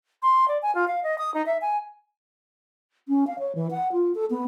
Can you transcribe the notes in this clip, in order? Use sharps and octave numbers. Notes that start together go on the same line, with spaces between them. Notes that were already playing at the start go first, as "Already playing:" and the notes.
C6
D5
G#5
F4
F5
D#5
D#6
D#4
E5
G#5
C#4
F5
C#5
E3
F#5
F4
A4
B3